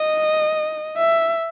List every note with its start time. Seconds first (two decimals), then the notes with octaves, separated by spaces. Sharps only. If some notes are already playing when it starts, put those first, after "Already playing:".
Already playing: D#5
0.98 E5